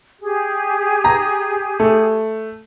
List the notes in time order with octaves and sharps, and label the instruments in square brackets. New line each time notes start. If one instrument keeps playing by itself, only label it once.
[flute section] G4 G#4
[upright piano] A#5
A3